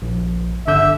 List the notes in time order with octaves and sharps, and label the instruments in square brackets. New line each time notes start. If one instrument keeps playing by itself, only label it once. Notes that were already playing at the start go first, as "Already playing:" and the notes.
[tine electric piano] A#1
[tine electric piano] G1 D3 G6 [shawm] E5